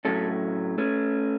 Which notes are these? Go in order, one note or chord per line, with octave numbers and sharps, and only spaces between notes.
A2 F#3 A3 C#4 A4
A3 C#4